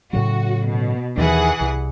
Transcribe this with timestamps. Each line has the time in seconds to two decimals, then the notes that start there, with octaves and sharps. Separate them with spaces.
0.13 A2 C#3 F#3 F#4
0.67 B2
1.18 D#2 D#3 E3 G#4 F#5
1.61 C2